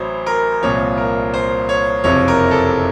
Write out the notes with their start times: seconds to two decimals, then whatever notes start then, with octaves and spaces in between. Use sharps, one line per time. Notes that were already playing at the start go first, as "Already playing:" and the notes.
Already playing: A1 A2 F#3 C5 C#5
0.26 A#4
0.62 C2 A#2 F3 C#5
0.98 A#4
1.34 C5
1.69 C#5
2.04 F#1 F2 C3 F3 C#5
2.28 A#4
2.51 A4